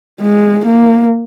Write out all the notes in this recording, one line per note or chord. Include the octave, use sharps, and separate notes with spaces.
G#3
A#3